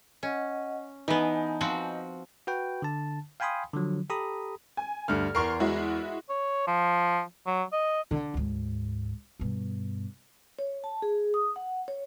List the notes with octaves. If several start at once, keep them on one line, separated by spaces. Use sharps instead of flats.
C#4 D#5 F#5
E3 B3 D#4 D#5 G#5 A5
F3 C4 F#4
F#4 B4 G5
D3 A5
F5 G5 G#5 B5 C6 D#6
D3 F3 F#3
G4 A4 A#5 B5 D#6
G#5
D2 G2 F6
E2 A#4 C6 C#6 C7
G#3 E4 F#4
C#5
F3
F#3
D#5
D3
D2 G#2
G2 B2
C#5
A5
G#4
D#6
F#5
C#5